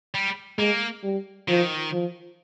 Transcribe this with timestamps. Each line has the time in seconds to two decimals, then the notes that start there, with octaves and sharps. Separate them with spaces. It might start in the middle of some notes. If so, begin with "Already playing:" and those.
0.14 G3
0.58 G#3 A#3
1.03 G3
1.48 D#3 F3
1.92 F3